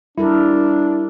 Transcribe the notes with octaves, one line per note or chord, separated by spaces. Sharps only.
G3 D4 E4 A4 A#4